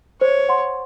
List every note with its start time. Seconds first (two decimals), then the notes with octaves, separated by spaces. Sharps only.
0.21 C5 C#5
0.48 F#5 C6